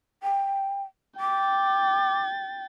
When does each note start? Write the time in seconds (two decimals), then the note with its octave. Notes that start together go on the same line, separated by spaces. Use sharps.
0.23 G5
1.20 G5 D6 A6